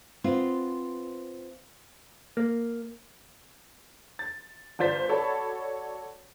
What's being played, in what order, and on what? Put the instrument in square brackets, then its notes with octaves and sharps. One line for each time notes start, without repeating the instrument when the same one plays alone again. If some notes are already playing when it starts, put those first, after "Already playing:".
[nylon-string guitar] B3 C4 F4
[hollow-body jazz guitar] A#3
[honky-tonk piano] A6
G1 D4 F4 C5 A6 B6
F#4 A4 C#5 D5 A5 B5